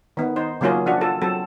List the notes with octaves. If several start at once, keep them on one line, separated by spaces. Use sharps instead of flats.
D#3 B3
D#4 C5
C#3 F#3 A#3 C#4 F4 G#4
F3 D4 F#4
F4 A4
F#3 C4 A4